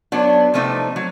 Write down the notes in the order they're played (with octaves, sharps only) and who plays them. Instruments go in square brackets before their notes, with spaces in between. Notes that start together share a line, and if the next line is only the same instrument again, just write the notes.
[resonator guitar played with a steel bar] F#3 B3 D4
C3 F3 A3 C4 D#4
F#3